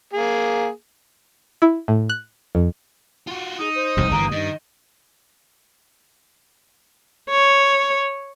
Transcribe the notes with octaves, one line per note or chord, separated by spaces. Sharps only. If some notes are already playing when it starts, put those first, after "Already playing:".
A#3 G#4
E4
A2
F#6
F2
F4 F#4
D#4 G#4 D#6
C5
E1 C2 F#2
G1 G2 E3 A#3 A#5
G2 D#3 D#5
C#5